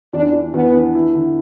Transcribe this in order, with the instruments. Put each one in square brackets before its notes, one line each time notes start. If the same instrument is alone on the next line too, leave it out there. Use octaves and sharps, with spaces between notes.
[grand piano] E2 [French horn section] D4
[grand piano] E3
[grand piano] E2 [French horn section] B3
[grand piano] D4
E4
D3